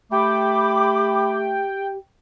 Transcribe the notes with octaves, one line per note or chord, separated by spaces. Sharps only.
A3 G4 G5 B5 D6